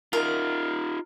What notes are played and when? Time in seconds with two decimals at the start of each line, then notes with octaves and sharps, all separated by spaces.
0.13 D#4 F4 A#4